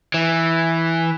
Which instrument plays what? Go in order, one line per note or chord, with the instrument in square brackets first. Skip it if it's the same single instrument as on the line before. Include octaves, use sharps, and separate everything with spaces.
[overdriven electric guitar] E3